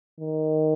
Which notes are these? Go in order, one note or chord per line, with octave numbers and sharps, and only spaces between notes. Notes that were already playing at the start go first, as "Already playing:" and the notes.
D#3